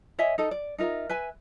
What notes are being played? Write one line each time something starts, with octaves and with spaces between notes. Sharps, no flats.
C#5 D#5 E5 G#5
D#4 A4 D#5
D5
D#4 F4 A#4 E5
B4 E5 G#5